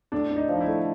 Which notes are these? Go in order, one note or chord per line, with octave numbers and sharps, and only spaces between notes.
A2 D4
D4
D#4
F3
D#4
E4
A3